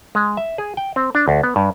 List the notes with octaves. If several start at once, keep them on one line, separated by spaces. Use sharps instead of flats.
G#3
E5
G#4
G5
C4
D4
D2
B3
G2